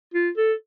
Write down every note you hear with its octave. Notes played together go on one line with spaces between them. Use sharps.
F4
A4